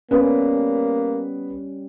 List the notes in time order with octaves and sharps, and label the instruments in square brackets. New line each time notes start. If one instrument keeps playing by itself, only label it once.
[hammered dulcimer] G3 [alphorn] A#3 [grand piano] B3 G4 B4 [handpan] C#4